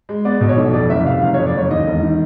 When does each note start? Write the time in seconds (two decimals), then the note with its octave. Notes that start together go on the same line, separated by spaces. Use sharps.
0.09 G#3
0.25 B3 D5
0.41 B2
0.49 C#5
0.57 B1
0.73 F2 D5
0.90 F#1 E5
1.06 C3 F5
1.22 F#1 F5
1.34 C#5
1.38 F2
1.47 D5
1.55 F#1 C#5
1.71 D#2 D#5
1.87 E1
2.03 D#3